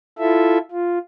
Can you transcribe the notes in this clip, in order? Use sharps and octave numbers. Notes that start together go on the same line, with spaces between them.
E4 F4 A4 E5
F4